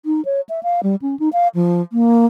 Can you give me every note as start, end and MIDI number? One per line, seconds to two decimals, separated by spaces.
0.06 0.23 63
0.25 0.41 73
0.49 0.60 76
0.63 0.81 77
0.83 0.95 55
1.02 1.18 61
1.19 1.29 63
1.33 1.48 77
1.55 1.82 53
1.92 2.26 58